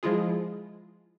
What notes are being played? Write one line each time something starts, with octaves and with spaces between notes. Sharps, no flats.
F3 G#3 E4 F4 G#4